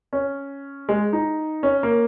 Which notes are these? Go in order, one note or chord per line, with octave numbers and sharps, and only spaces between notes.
C#4
G#3
D#4
C#4
A#3